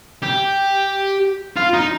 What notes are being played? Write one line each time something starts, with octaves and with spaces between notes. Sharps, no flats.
G4
F4
D#4